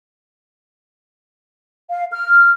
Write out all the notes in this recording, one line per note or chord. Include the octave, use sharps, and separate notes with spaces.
F5
F6